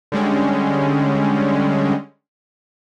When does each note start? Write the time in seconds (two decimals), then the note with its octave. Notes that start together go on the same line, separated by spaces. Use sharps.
0.12 D3 G3 G#3 C#4